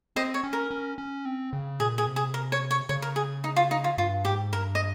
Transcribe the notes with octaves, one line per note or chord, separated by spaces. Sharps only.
C4 C5 D#5
C#5
C#4
A#4
C#4
C#4
C4
C#3
A#2 G#4
G#4
C3
G#4
A#4
C#5
C#5
C#3 C#5
A#4
G#4
D#4
F4
D#4
F4
G2 F4
G#2 G4
G2 A#4
D#5